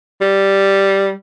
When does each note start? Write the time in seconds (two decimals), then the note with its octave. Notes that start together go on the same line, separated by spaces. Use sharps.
0.21 G3